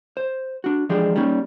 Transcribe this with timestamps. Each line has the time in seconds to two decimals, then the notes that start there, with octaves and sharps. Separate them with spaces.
0.17 C5
0.64 D4 F#4
0.89 E3 F3 G#3 D4 G4 G#4
1.16 G3 A#3 C#4 D#4